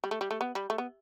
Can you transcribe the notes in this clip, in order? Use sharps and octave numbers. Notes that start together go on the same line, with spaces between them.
G3
A3
G3
A3
B3
G3
A3
B3